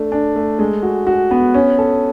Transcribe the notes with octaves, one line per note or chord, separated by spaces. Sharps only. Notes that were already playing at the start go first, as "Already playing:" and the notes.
Already playing: A3 D4
D4
A3
G#3
F#4
F#4
B3
C#4
A4